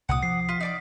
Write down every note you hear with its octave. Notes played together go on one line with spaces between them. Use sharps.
C2 A#2 F#5 D6 D#6
F3 C7
F4 B6
D#4 D5 D6